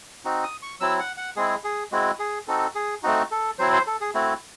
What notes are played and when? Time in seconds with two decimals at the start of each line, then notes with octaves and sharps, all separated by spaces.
0.25 C4 D#4 F#4
0.44 D#6
0.62 C#6
0.80 F#3 C4 E4 E6
0.99 F#5
1.17 F#5
1.36 G#3 C4 E4 G#4
1.64 G#4
1.92 G#3 C4 E4 F#4
2.19 G#4
2.48 C4 D#4 F#4 A4
2.75 G#4
3.03 A3 C4 D#4 F#4
3.31 A4
3.59 F#3 C4 E4 C5
3.72 C5
3.87 A4
4.01 G#4
4.14 A3 C4 E4 F#4